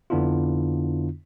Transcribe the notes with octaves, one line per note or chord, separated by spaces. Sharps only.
F2 D3 B3 D4 E4 F4